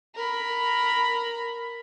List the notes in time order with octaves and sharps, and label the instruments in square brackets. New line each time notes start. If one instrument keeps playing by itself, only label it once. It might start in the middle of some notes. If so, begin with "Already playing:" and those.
[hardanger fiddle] A#4 B5